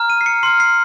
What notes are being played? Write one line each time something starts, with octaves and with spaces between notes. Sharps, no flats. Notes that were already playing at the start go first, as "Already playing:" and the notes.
Already playing: A#5 F6
D#7
C7
C#7
C6 F6 C7
C7